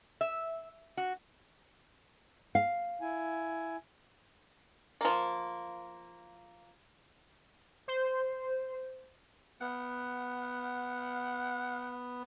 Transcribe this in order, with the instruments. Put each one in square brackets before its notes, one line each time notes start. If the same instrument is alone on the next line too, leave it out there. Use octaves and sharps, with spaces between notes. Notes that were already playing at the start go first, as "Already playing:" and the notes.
[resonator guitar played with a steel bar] E5
F#4
[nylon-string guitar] F5
[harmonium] E4 G#5
[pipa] F3 A#3
[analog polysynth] C5
[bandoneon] B3 [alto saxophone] F#5